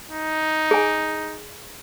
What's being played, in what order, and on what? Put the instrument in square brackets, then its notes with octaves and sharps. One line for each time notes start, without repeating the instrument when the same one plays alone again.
[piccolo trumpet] D#4
[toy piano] G#4 G#5